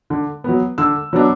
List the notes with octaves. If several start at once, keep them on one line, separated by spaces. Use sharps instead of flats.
D3
F#3 B3
D3 E6
F#3 B3 D4